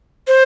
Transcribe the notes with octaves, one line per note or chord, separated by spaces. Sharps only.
C5